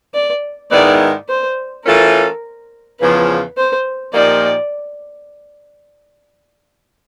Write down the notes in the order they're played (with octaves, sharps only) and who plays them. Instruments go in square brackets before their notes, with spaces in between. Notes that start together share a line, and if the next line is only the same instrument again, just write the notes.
[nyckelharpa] D5
[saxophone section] G#2 D#3 G#3 B3 E4 [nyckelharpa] D5
[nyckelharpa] C5
[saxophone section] E3 A3 C#4 F4 A4 [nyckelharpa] A#4
[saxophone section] E2 C#3 F3 [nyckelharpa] B4
[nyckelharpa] C5
[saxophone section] A#2 F3 A#3 D#4 G4 [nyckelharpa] D5